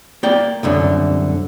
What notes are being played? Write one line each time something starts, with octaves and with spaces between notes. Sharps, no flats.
A#3 D5 G5
C2 F#2 D3